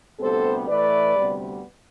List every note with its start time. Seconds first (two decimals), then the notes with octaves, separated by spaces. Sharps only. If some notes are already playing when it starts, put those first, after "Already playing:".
0.20 D2 C3 G3 B3 A4 C5
0.68 A2 E3 A3 B4 D5
1.15 D2 C3 G3 B3